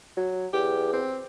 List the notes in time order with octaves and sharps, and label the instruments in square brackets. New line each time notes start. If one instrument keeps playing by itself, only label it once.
[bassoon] F#3
[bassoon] E2 [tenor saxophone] G4
[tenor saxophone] C4